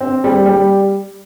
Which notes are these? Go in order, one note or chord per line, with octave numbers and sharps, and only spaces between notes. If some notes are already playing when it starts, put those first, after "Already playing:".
C4
G3
G3